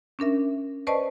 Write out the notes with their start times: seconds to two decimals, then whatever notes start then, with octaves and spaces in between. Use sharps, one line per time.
0.19 C#4 D4 A#4 E5
0.87 B4 C5 D5 D#5 A5 C#6